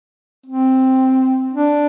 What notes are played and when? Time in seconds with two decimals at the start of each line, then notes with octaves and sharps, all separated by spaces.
0.46 C4
1.54 D4